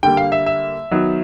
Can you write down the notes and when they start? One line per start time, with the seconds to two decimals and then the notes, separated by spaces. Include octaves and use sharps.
0.03 D3 G3 A#3 G5
0.17 F5
0.32 E5
0.46 E5
0.91 D#3 F#3 B3